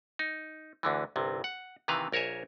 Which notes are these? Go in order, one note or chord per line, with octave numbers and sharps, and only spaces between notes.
D#4
D2 D3 E3
G1 C2 C3
F#5
C3 D#3 E3 B4 F5
A#1 A#4 C#5 E5 G#5